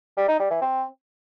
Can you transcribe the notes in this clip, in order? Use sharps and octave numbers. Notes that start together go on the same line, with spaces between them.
G3
D#4
G3
E3
C4